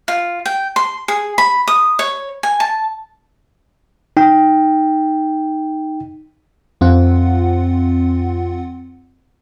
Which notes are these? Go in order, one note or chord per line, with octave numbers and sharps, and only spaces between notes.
F4
G5
C6
G#4
B5
D#6
C#5
G#5
A5
D#4 G5
F2 C4 F4 F#5